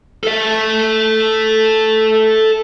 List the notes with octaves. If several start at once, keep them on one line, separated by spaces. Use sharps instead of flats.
A4 E5